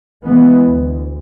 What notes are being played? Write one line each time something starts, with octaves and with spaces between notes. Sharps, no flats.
E3 G#3 B3
D2